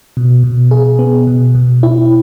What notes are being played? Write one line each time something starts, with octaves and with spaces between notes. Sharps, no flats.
B2
B2
G#4
B3
B2
B2
E4